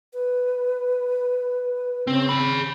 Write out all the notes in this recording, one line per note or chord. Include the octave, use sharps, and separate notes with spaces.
B4
C#3 C4
G#4 B5